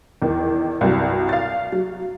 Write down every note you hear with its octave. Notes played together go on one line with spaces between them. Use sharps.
E2 D#3
C2 G2 F#3
F5 A6
F#3